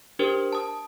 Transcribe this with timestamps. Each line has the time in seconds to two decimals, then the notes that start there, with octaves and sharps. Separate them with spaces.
0.19 D4 G4 A#4 C5
0.52 A5 D#6